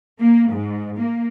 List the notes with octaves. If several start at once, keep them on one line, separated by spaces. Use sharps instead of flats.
A#3
G#2
A#3